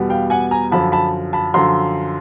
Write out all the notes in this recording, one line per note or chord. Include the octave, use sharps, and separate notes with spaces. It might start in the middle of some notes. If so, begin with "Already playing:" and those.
Already playing: E2 B2 G3 B3
F5 G5
F#5 G#5
G#5 A#5
F#2 D3 F3 A5 B5
A5 B5
A5 B5
F#2 D3 F3 A#5 C6